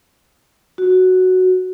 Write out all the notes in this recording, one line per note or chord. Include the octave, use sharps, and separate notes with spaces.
F#4